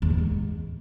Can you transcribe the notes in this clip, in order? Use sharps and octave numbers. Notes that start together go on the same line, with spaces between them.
E2
B2
G#2